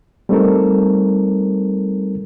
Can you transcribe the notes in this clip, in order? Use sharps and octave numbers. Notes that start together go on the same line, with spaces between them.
G3 A3 C4 D#4 A4 A#4